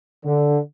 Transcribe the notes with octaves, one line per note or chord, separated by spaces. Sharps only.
D3